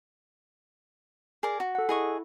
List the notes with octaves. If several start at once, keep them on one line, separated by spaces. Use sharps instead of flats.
G#4 A#4 D5
F#4
A4 F#5
E4 G#4 D#5 C#6